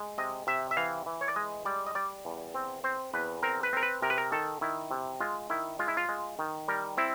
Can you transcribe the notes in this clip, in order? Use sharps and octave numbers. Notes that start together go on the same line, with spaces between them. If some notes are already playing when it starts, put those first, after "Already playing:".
Already playing: G#3
C3 D#5
C3 E5
E5
E3 F5
E3
C#5
D5
G#3 D#5
G3 D5
D#5
G3 D5
E2
C4
C4 C5
E2 B4
C4 A#4
B4
C4 A#4
B4
C3 A#4
B4
A#4
D#3 A4
D#3 E4
C3
G#3 F4
D#3 E4
G#3 F4
E4
F4
G#3
D#3
G3 A#4
C4 E4